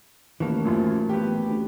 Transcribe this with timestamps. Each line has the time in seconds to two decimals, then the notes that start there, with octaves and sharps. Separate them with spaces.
0.40 D#2 E3 A3 A#3 C#4
0.65 A1 F#2 A#2 F3
1.09 B3 G4
1.25 B1
1.48 D2